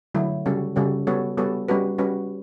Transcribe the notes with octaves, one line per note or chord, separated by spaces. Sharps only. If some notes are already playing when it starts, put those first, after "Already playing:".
D3 F#3 A3 E4
C#3 G3 C#4 F#4 A4
C#3 G3 C#4 F#4 A4
G3 B3 F#4 A4 C#5
G3 B3 F#4 A4 C#5
G3 C#4 F#4 B4
G3 C#4 F#4 B4